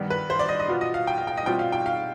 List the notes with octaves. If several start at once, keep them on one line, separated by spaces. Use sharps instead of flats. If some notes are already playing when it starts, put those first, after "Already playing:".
Already playing: G2 D#3 G3 B3
B4
C5
D5
D#5
D#5
B2 B3 F4
D#5
F5
G5
F5
G5
D#5
B2 G3 C4 F4 G5
F5
G5
F5